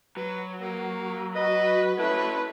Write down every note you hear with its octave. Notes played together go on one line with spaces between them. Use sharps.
F#3 B4
A#3
F#4 B4 D#5
A3 C#4 E4 B4